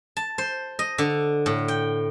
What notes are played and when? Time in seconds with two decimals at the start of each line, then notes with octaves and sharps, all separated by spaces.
0.17 A5
0.38 C5
0.79 D#5
0.98 D3
1.46 A2
1.68 G5